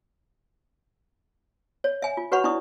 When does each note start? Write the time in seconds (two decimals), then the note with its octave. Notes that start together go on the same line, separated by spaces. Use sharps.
1.84 C#5
2.02 E5 G#5
2.17 F4
2.32 F#4 B4 C#5 F#5 B5 C#6
2.44 D4 E4 D5 C#6 D#6